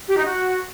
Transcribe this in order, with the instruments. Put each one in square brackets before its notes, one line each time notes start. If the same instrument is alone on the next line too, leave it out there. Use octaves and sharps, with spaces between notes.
[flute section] G4
D#4
F#4